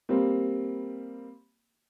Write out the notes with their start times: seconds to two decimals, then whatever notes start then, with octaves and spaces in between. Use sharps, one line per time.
0.09 G3 A#3 C4